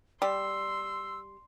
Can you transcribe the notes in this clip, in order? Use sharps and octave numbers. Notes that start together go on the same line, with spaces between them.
G3 C6 E6